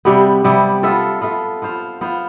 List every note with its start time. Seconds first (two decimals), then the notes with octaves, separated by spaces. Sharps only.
0.05 C3 G3 B3
0.44 C3 G3 B3
0.83 B3 F4 A4 E5
1.21 B3 F4 A4 E5
1.62 B3 F4 C5 F5
2.01 B3 F4 C5 F5